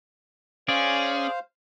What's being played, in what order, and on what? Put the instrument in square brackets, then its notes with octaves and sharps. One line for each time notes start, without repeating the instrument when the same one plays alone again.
[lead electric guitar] C#4 [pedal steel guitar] G#4 D5 [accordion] C5 F5